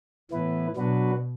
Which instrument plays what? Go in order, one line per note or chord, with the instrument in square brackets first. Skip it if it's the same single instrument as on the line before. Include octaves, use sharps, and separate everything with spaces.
[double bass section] A2 [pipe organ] E3 B3 E4 B4
[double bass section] B2 [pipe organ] F#3 B3 D4 F#4 B4